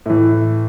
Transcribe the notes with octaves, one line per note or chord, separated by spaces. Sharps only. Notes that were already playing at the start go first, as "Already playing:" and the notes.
A2 E3